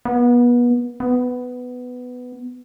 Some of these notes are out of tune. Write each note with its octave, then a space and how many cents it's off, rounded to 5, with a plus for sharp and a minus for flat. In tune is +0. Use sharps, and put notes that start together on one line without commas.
B3 -30
B3 +10